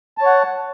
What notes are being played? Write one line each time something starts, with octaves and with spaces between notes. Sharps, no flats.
C#5 F#5 A5